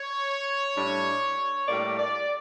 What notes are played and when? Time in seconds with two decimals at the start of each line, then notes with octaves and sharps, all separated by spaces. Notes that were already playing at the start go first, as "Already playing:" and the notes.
Already playing: C#5
0.75 A2 G3 D4
1.67 A2 G3 A#3 D5
1.97 D5